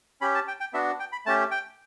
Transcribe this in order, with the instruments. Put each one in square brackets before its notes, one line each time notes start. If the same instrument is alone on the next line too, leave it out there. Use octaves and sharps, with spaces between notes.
[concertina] C#4 G4 B5
A5
G5
G5
B3 D4 F#4 E5
G5
B5
A3 C#4 G4 A5
G5